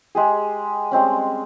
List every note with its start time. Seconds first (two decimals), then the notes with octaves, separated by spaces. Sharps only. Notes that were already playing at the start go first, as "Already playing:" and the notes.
0.15 G#3 G4 G#4
0.91 G3 G#3 C4 C#4